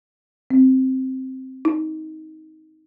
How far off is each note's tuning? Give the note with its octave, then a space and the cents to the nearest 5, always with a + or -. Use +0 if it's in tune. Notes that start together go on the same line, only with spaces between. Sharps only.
C4 +0
D#4 +20